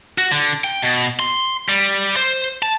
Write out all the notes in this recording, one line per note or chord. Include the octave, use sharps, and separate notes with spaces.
F#4
D3
G5
B2
C6
G3
C5
A5